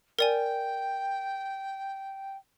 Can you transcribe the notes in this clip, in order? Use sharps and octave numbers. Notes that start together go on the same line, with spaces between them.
A#4 D5 G5 G#5